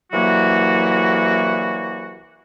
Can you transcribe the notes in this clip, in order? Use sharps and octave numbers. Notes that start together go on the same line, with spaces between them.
C2 E3 F#3 A#3 F#4